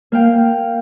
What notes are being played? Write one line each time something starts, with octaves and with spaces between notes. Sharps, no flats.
A#3 F5 G5